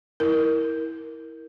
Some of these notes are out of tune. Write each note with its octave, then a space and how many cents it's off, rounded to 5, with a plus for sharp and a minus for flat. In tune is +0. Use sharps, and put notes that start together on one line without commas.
E4 -20 A#4 +0